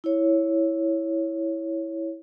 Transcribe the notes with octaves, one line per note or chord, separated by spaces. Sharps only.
E4 C#5